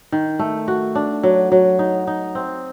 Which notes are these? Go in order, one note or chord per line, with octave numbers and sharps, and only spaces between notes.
D#3
A3
F#4
D4
F#3
F#3
D#4
D#4
C4